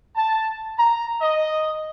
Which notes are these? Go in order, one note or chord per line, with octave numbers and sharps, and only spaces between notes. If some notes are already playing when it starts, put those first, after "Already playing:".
A5
A#5
D#5